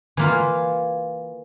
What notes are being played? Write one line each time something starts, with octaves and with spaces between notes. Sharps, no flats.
E3 A#3 F4